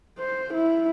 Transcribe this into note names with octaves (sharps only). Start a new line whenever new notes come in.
C5
E4